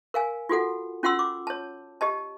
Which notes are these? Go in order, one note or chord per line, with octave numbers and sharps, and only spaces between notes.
A#4 F5 G#5
F4 F#4 A4 F#5
C#4 F4 F#5 C6 E6
D6
C#5 A5
G4 D#5 A5